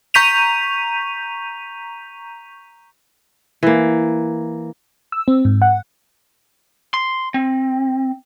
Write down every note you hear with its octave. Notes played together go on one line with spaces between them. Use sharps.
A#5 C#6 G6 B6 D#7 F7
E3 A#3
E6
C4
G#2
F#5
C6
C4